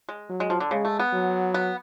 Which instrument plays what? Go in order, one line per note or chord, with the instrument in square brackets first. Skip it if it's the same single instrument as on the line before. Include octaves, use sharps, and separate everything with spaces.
[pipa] G#3
[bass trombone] F#3
[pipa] G#3
F3
D3
[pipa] C#3 [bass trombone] G#3
[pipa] A3
B3
[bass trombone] F#3
[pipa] B3